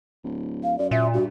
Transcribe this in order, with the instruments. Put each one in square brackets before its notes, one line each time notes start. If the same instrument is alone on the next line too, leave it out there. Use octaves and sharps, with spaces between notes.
[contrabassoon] D1
[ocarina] F5
[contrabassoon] F#2 [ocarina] D5
[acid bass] A#2 [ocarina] E5
[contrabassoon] G2 [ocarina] F#4